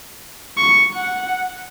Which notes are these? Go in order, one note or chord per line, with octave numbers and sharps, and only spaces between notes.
C#6
F#5